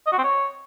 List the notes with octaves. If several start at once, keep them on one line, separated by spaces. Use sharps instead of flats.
D#5
F#4
C4
C#5